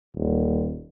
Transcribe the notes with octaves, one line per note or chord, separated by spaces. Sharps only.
D#1